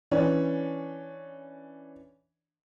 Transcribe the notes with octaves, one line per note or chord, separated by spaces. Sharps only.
E3 C#4 D4 C#5